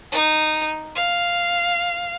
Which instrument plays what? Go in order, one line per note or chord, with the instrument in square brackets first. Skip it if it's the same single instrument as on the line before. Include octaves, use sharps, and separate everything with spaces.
[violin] D#4
F5